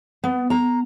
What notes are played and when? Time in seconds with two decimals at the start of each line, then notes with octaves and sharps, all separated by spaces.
0.24 B3
0.50 A#5